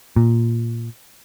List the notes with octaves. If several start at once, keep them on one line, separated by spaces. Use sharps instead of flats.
A#2